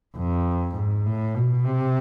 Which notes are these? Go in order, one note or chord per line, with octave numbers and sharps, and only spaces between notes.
F2
G#2
A2
B2
C3